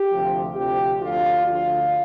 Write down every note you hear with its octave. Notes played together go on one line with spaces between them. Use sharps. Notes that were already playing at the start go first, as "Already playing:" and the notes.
Already playing: G4
D2 C3 F3
D2 C3 F3 G4
D2 D3 F3 F4
D2 D3 F3 F4